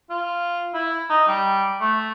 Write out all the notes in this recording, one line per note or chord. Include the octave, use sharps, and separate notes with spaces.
F4
E4
D#4
G3
A3